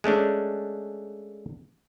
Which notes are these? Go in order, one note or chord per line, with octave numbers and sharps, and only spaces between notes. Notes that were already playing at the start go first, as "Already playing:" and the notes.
G#3 A3 C#4 D4